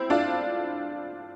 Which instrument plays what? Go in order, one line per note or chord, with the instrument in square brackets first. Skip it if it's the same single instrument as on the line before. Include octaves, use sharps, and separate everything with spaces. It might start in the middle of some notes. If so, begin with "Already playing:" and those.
Already playing: [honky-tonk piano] C4 E4
D4 F4